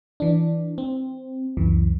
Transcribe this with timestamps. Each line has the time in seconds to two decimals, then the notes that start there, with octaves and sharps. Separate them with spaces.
0.20 E3 D4
0.78 C4
1.57 C#2 F#2 E3